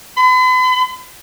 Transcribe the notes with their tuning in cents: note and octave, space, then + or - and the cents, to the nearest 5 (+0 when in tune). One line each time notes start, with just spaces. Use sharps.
B5 +45